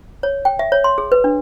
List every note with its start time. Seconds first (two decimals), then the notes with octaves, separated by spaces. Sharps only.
0.23 C#5
0.45 G5
0.59 E5
0.72 C#5
0.84 C6
0.98 G#4
1.12 B4
1.24 D4